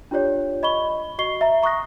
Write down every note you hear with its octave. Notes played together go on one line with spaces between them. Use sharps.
D4 F4 G4 C#5 D5
D#5 B5 C#6 G7
F#4 D#5 C#6 C7 G7
E5 A#5
A#5 C#6 D#6 F#6 A#6